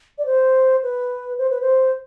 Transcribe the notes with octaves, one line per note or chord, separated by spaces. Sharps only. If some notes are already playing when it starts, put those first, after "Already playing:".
D5
C5
B4
C5
B4
C5